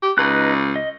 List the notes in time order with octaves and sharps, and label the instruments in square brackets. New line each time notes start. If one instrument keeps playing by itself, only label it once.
[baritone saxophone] G4
[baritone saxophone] C#2 [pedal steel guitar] D#4 B4 F#6
[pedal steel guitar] D#5